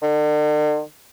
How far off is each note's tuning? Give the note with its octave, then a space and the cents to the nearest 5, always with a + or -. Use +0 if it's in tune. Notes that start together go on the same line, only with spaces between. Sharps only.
D3 +45